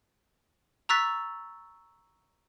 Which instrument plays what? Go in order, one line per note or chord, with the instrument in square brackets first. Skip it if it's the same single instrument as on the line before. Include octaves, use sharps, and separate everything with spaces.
[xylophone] A#5 C#6 E6 F#6 A6 B6